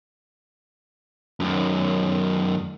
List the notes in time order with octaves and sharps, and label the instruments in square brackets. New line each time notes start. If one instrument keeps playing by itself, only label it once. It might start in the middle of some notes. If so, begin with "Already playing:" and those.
[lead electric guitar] F#2 D#3